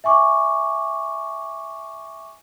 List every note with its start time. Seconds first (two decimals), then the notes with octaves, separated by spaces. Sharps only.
0.04 E5 G#5 C#6 D6